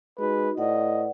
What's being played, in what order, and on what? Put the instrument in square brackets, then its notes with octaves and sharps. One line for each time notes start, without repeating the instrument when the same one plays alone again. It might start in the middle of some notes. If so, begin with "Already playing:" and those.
[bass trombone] G#3 [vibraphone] D#4 F#4 [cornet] B4
[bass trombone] A2 [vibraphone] B4 D5 F#5 [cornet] D#5